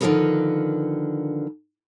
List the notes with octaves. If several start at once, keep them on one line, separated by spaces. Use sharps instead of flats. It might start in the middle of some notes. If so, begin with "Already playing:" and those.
D3 D#3 F3 G#4 A#4 B4